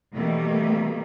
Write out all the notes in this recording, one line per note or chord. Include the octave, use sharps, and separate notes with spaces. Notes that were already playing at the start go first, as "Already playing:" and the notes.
B2 D#3 E3 G3 A3 A#3